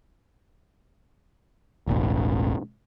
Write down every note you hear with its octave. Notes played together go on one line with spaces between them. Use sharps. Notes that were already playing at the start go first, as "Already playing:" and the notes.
E1 A1